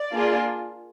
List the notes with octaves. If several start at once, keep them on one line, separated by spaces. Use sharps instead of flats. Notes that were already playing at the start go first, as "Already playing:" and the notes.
Already playing: D5
A#3 D4 F4 G#4